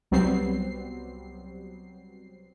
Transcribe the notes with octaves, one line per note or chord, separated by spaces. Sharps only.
C2 F#3 G3 B3 C4 C7